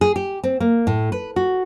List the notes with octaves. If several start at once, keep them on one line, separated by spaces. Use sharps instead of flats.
G#4
G4
C4
A#3
A2
B4
F#4